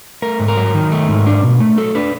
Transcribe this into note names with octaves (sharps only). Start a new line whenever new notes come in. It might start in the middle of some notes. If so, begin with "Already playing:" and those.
A3 A#4
G#2
A#4
F#3
D#3
A3
G#2
D4
B2
A3
F#3 A4
D4 B4